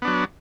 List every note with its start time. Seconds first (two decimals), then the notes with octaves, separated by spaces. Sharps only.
0.02 B3
0.05 D4
0.08 F#3